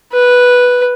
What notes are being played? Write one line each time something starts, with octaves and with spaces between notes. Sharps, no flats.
B4